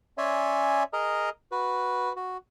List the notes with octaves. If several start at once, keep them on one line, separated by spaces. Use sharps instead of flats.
C#4 C#5 D5 E5 G#5 C6
G#4 A#4 D#5 A#5
F#4 B4
F#4